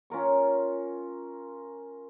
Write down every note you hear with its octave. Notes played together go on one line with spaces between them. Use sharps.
C#4 F4 A#4 C#6